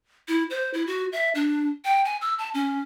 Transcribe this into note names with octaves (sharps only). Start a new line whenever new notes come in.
E4
C5
E4
F#4
E5
D4
G5
G#5
E6
A5
C#4